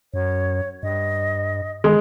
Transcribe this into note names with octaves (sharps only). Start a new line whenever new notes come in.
F#2 C#5
G2 D#5
D#3 G#3